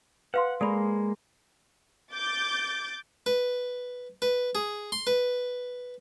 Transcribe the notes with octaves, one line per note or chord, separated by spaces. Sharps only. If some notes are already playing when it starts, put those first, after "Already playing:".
B4 F5 F#5 C6
G#3 A#3 A4 D5 B5
D6 G6 A6
B4
B4
G#4
C6
B4